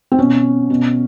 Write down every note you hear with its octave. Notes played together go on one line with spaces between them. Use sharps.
C4
B2 C#4
B2